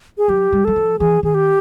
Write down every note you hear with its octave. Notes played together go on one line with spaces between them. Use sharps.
G#4
F#3 G4
G3
F#3 A4
F3
E3 G#4
D#3 G#4
G4